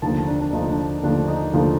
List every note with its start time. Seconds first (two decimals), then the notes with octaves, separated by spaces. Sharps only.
0.02 D#2 D3 F3 A3 A5
0.28 D4
0.41 D4
0.52 D#2 D3 F3 A3 D#4
0.70 D4
1.03 D#2 D3 F3 A3 D4
1.28 D#4
1.53 D#2 D3 F3 A3 F4